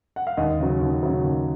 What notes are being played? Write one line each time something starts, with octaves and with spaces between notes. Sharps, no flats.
F#5
F5
D#2 D#5
C#3 F#3
D#2
C#3 F#3
D#2